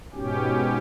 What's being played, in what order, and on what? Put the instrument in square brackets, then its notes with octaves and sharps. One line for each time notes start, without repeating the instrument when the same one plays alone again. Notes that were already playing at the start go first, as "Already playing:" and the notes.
[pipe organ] G#2 B2 C#4 G4